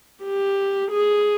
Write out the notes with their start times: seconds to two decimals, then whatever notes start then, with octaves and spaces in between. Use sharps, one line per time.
0.24 G4
0.91 G#4